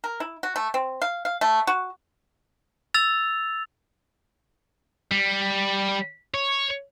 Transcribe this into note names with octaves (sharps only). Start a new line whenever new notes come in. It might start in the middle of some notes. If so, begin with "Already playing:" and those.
A#4
E4
F#4
A3
C4
F5
F5
A3
F#4
E6 A6 F7
G3
C#5